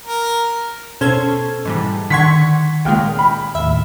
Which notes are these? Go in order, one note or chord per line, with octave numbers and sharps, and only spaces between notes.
A#4
B2 C#4 A4 C5 G#6
G#2 E3 G3
D3 D#3 F#5 C6 C#6 G#6 B6
C#2 A#2 G#3 G5 F6
B5
D#2 A2 E5